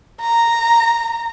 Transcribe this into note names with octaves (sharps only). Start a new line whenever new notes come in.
A#5